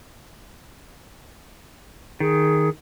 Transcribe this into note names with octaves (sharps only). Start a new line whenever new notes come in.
D#3 G#4